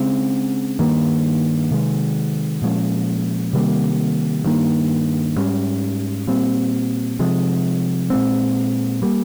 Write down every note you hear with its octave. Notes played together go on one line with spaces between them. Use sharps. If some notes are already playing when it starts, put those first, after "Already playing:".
Already playing: C#3 G#3 C4
G2 D#3 A#3
C3 D#3 G#3
A#2 F3 G#3 C#4
C3 D#3 G3 A#3
G2 D#3 A#3
G#2 G3 C#4
A#2 G3 C4
C3 F3 G#3
A#2 G#3 C4
G3 A#3